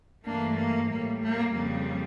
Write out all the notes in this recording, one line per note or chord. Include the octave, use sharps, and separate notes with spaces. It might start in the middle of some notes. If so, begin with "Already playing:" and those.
G2 E3 A3 A#3 D4
A#3
A2 G3 A#3
A#3
F2 C#3 G3 A#3